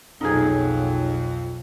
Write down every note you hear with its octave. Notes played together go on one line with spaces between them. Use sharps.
B1 F2 F#3 D#4 F4 G#4